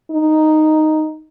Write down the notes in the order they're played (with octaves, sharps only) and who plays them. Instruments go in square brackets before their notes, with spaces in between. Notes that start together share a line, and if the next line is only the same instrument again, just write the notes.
[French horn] D#4